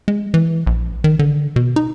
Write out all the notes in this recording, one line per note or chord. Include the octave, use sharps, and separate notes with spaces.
G#3
E3
A#1
D#3
D3
B2
D#4